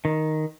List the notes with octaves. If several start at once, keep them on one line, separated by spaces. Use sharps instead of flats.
D#3